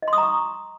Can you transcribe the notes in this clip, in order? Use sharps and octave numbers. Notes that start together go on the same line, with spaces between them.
D#5
C6
D#6
A#5
C#6